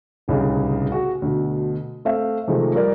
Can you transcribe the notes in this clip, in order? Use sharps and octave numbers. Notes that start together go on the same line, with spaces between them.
D1 C2 C#3 D#4 G4 G#4
F#4 G#4
D2 B2
A3 C4 E5 F5
C3 D#3 F3 G#3 A3
F3 G3 A#4 D5